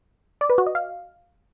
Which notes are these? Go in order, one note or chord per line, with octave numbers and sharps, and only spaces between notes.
D5
B4
F#4
D#5
F5